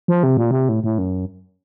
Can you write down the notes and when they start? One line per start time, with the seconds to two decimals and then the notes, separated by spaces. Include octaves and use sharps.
0.08 F3
0.23 C3
0.37 A#2
0.51 C3
0.69 A2
0.84 A2
0.98 F#2